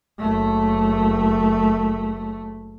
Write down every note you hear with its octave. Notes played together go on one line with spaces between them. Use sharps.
F#1 A3